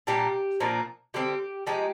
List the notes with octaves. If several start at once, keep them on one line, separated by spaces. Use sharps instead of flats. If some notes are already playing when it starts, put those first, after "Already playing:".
A#2 G3 A#3 D4 G4
A#2 F3 A#3 D4
D3 G3 C4 G4
F3 G#3 D#4 G4